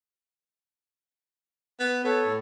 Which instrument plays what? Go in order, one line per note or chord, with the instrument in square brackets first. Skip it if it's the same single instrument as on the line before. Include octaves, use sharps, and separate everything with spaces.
[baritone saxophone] B3
[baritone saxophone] B3 [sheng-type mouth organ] A4 C#5
[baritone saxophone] A2